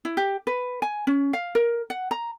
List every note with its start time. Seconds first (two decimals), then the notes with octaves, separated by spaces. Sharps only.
0.05 E4
0.17 G4
0.47 B4
0.82 G#5
1.07 C#4
1.33 F5
1.55 A#4
1.90 F#5
2.11 A#5